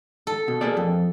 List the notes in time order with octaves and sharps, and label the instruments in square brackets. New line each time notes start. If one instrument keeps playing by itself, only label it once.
[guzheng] A4
[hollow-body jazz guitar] B2
A#3 G#4 D5
F2